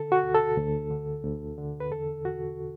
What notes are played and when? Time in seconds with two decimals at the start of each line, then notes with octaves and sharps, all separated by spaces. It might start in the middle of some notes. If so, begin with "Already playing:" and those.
Already playing: D3 A4
0.12 F#4
0.23 D2
0.34 A4
0.57 D2
0.91 D3
1.24 D2
1.58 D3
1.80 B4
1.91 E2 A4
2.25 E2 F#4